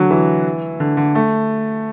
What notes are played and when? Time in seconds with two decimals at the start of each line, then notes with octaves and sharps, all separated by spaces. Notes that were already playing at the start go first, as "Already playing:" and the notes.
Already playing: D3 F#3
0.11 E3
0.80 D3
0.97 D3
1.15 A3